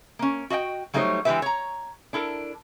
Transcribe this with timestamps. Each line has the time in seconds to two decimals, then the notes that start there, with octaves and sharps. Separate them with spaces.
0.19 A#3 C#4
0.50 F#4 D#5 E5 G5
0.94 F#3 G3 A3 D#4 C5 C#5
1.25 E3 G#3 D4 G4 B4 E5
1.42 C#5 A#5
2.13 D4 E4 A4 A#4